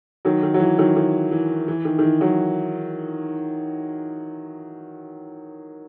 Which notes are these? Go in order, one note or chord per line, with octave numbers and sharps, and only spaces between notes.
D#3 F#3
D#3
F#3
E3
D#3 F#3
D#3
E3
E3
D#3
D#3
E3
D#3 F#3